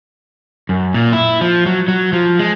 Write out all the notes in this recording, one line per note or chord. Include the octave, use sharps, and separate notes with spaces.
F#2
A#2
E4
F3
F#3
F#3
F3
G#3